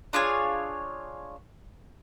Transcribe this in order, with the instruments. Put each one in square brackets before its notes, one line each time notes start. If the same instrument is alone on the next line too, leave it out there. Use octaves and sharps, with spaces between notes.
[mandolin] D4 F4 G#4 C#5